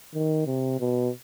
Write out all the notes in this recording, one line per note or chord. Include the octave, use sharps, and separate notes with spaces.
D#3
C3
B2